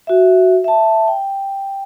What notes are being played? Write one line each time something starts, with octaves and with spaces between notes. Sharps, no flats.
F#4 E5
E5 A5
G5